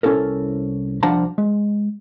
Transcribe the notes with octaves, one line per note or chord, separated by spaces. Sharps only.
C2 C#4 E4 A4 A#4
C2 F3 D4 F#5 A5 A#5
G#3